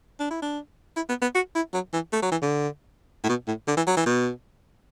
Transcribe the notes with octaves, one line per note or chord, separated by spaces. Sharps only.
D4
E4
D4
E4
B3
B3
F#4
E4
F#3
E3
A3
F#3
E3
D3
A2
B2
A2
D3
E3
F#3
E3
B2